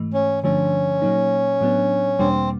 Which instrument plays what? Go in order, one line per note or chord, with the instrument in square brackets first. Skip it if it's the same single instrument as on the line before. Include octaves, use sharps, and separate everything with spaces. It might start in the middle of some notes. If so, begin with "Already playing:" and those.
Already playing: [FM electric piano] G#2 E3 A3
[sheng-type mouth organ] C#4
[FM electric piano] G2 D3 F3 A3 D4 [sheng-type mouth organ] C#4
[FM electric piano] A#2 F#3 A#3 D#4
A2 F#3 B3 D4
[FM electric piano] E2 B2 G3 A#3 D4 [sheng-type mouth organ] C4